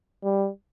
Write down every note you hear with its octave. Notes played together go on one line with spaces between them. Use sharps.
G3